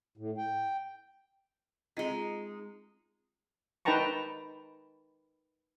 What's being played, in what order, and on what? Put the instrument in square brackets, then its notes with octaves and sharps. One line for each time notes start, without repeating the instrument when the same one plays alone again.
[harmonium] A2
G5
[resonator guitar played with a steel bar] G#3 D#4 [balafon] C4 F4 D#5
[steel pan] D#4 B4 G5 A5 A#5 C#6